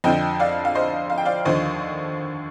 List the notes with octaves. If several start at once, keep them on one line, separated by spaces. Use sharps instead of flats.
F2 D3 F3 D#5 G5
D5 F5
F5
C5 D#5
F5
G5
D5 F5
D#2 D3 F3 C5 D#5